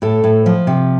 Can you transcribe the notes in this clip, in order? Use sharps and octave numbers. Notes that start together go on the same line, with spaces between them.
A2 A4
A2
F3
C3